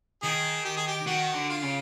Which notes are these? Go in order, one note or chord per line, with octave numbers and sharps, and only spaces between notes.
D#3 G#4
G4
G#4
G4
D#3 F#4
D3
F4
C#3